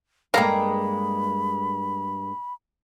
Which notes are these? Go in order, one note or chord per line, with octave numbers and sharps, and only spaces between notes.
G2 G#3 A#3 A4 F5 G5 A#5 B5